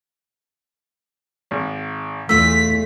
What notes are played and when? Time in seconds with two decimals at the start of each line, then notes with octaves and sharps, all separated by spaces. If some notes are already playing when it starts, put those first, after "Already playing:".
1.51 G#1
2.29 E2 A3 F4 E6 B6